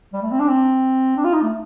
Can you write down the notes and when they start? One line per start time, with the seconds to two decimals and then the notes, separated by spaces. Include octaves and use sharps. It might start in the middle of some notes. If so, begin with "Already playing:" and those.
0.14 G3
0.23 A3
0.31 C4
0.40 D4
0.48 C4
1.17 D4
1.25 F4
1.33 D#4
1.42 A3